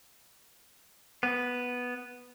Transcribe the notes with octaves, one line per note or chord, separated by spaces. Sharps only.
B3